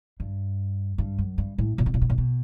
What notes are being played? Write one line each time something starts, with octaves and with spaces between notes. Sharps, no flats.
G2
G2
F#2
G2
A2
A#2
B2
A#2
B2
A#2
B2